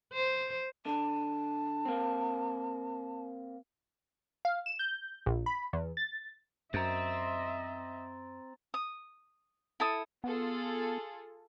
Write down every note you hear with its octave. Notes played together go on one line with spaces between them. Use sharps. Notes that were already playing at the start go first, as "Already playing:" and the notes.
C5
D3 A5
A#3 C4
F5
E7
G6
A#1
B5
E2
A6
F#2 C4 D#5 E5 A#5 A6
D#6
E4 A4 D#6
B3 F4 G#4 A4